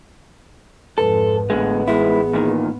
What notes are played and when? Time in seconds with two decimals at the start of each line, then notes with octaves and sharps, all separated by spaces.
0.98 F2 G#2 A4 B4
1.50 A1 D2 D3 G#3 B3
1.88 G#2 G#3 E4 G#4
2.33 E2 A#2 D#3